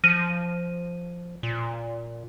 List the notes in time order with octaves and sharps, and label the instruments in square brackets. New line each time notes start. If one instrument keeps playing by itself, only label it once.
[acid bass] F3 [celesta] F6 A#6 D#7
[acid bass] A#2